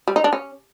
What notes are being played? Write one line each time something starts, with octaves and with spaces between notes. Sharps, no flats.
G3
D#4
D4
C#4